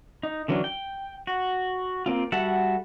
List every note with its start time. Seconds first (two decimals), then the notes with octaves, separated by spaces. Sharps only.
0.23 D#4
0.48 D3 E3 F#3 C#4 D4
0.64 G5
1.27 F#4
2.06 A#3 C4 F4
2.32 G3 F#4 A4 E5 F#5